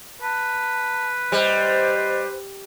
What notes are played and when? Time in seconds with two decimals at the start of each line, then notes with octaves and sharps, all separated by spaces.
0.22 B4 A5
1.32 G3 C5 D#5